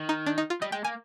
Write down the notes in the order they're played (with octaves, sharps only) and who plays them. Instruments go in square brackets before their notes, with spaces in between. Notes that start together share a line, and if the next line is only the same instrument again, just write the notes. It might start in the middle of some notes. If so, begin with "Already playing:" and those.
Already playing: [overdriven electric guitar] D#3
[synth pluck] D#4
D4
D#4
F4
[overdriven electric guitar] G3 [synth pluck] D#5
[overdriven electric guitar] G#3 [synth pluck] G5
[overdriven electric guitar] A#3 [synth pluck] G#5